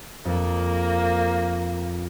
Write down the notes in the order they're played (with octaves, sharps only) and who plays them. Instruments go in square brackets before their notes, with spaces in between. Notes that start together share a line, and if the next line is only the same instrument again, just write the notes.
[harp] F2 [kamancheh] A#3